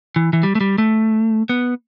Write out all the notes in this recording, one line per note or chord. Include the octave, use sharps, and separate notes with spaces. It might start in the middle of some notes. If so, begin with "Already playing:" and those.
E3
E3
G3
A3
G3
A3
B3